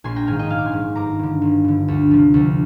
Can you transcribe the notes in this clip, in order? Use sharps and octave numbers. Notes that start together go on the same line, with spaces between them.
A#1 G#5 C6
G5 A#5
G#2 D#3 F5 G#5
D#5 G5
A#1 F5 G#5
D6
G#5 C6
G#2 D#3
G1 A#5 D6
G2 D3
G1
G2 D3
D2
C3 F3
D2